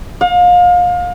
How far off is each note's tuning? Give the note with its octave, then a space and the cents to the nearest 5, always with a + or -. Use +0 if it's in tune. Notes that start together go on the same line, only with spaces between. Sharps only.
F5 +30